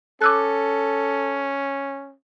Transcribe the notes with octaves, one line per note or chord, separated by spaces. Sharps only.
C#4 A4 D6 E6 F#6